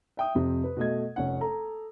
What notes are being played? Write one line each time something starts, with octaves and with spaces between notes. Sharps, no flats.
E5 G5 D#6
F2 C3
B4
B2 A3 D#5 G#6
F1 C#4 F#5
A4 A#5